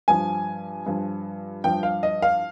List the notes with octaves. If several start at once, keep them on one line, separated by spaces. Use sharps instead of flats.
G2 F3 G#5
G2 F3
G2 F3 G5
F5
D#5
F5